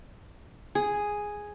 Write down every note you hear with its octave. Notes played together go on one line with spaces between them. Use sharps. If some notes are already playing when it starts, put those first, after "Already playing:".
G#4